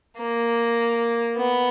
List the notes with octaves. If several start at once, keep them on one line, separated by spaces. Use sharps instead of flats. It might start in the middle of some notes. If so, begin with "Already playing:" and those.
A#3
B3